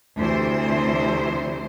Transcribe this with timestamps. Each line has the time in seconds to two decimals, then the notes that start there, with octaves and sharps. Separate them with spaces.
0.17 D2 C3 E3 C5